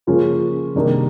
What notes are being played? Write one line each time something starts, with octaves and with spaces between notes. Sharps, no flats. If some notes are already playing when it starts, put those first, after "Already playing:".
C#3 F3 A#3 C#4 F4
C3 D#3 G3 A#3 D4